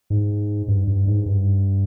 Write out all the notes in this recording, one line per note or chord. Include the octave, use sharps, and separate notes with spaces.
G#2
G2
G2
G#2
G2